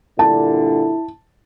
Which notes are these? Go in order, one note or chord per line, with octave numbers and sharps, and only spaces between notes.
G2 A#2 D3 E4 A5